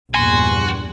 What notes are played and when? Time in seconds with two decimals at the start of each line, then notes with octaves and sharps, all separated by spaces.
0.14 A#1 E2 G2 F#4 G#5 C6